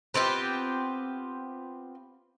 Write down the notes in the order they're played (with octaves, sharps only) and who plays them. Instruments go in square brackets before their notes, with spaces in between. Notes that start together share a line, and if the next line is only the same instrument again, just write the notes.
[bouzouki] B3 C4 F4 G4